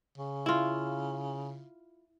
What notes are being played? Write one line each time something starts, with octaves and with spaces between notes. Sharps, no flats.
C#3
E4 F4